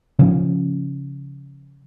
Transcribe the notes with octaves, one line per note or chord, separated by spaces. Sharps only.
C#3 F3 C#4